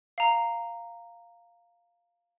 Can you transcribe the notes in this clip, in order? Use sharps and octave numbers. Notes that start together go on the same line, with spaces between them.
F5 A#5